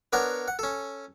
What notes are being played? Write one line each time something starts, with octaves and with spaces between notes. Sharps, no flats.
B3 D4 A#4 C#5 F#5
F#5
C#4 A4